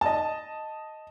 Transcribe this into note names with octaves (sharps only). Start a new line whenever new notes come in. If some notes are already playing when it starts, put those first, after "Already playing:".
D#5 A5